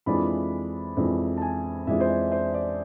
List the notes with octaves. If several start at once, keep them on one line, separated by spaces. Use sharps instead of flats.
F2 E3 G#3 D4 F4 B5
F2 E3 G#3 D4 F4
A5
G#5
F2 E3 G#3 D4 F4 E5
C5
D5
C5
D5